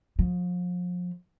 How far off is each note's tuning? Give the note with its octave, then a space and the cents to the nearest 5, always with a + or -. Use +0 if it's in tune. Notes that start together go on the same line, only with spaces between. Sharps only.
F3 +35